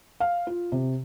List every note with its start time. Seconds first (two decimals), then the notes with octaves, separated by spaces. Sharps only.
0.20 F5
0.47 F4
0.72 C3